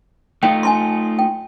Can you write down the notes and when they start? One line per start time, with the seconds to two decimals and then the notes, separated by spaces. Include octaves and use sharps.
0.43 A3 D#4 F4 G5
0.63 G#5 A5 C6
1.19 G5